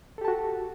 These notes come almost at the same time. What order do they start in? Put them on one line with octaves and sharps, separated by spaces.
A4 G4 A5 F#4